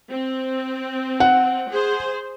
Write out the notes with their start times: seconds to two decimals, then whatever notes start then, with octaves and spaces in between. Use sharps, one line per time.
0.10 C4
1.20 F#5
1.69 G#4 C5